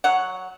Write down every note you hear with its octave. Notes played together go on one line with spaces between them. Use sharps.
F#3 F#5